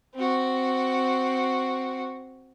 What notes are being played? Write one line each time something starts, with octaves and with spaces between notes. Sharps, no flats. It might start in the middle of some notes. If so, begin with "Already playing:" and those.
C4 F#4